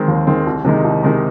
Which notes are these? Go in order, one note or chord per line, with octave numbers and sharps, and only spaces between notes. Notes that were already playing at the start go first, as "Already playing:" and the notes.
Already playing: D#3 G#3 C4
D#2
D#3 G#3 C4
C2
C3 D#3 G#3 D#4
C2
C3 D#3 G#3 D#4